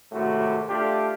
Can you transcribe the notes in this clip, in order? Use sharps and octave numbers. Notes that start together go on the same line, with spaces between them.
G#1 A2 C3 A3 F#4
A3 D4 F4 G4